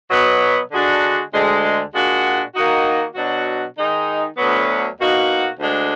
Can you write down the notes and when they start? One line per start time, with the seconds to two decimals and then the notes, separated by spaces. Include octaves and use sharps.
0.10 B2 F#3 B3
0.71 D3 G#3 D4 F#4
1.32 D2 D3 G#3
1.92 A#2 G#3 D4 F#4
2.54 D#3 A#3 D#4 F#4
3.15 B2 F#3 D4 F#4
3.76 D#3 G#3 D#4
4.36 D2 D3 F#3 B3
4.97 B2 A#3 D#4 F#4
5.58 D2 D3 G#3 D4